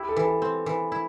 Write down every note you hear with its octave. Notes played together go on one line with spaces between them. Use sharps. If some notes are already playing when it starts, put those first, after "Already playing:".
Already playing: E4 G4
A4
E3
A4
C4
E3
E4